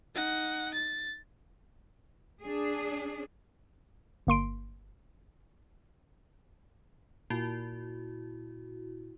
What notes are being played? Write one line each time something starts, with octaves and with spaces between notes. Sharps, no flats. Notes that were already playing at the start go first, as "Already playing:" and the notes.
D#4 F#5
A6
D4 G#4
G1 A#3 C6 D7
A#2 E4 F#4